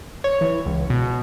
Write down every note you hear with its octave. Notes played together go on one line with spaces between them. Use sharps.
C#5
E3
C#2
B2